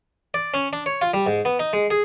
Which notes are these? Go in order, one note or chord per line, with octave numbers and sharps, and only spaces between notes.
D5
C#4
D4
C#5
F4
G3
G#2
B3
D#4
G#3
G#4